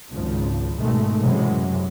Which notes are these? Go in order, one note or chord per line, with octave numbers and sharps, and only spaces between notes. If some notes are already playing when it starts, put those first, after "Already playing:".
G#1 C#2 C#3 F3
G#1 B2 D#3 G#3 A3
F#2 A2 C3 E3 F#3 G#3